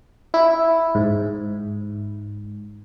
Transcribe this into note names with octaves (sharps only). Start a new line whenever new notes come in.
E4
G#2